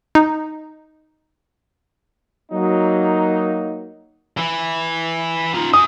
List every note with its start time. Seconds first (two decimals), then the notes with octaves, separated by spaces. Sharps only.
0.15 D#4
2.52 F#3 A#3 D#4
4.37 E3
5.54 D#4 F4
5.74 F#4 G#5 D#6